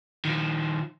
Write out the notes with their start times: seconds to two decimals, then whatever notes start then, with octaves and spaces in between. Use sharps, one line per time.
0.25 D#3 F3